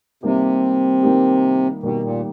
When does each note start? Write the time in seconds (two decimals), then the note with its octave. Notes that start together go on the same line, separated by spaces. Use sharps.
0.23 C3 D#3 G3 A#3 D#4 G4
1.03 D#3 G3 A#3 D#4 G4
1.83 B2 D#3 G3 A#3 D#4 G4
2.03 A#2